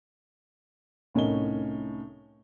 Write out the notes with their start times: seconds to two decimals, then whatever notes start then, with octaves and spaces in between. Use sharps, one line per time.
1.14 C2 A2 C#4 D#4 A#4 G7